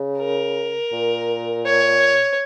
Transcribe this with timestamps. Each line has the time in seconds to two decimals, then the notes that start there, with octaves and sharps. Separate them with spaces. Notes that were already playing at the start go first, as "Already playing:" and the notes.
Already playing: C#3
0.19 A#4
0.92 A#2
1.66 C#5